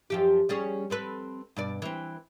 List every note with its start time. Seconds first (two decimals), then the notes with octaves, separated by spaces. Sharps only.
0.10 F#2 F3 G4
0.49 G3 C#4 G#4
0.90 C4 A4 B4
1.56 G2 B2 D5
1.82 E3 C4